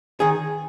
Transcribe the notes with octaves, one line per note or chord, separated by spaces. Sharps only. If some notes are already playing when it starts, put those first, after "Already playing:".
D#3 G#4